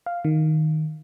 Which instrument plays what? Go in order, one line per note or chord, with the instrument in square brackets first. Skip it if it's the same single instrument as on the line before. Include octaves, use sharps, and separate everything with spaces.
[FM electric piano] F5
D#3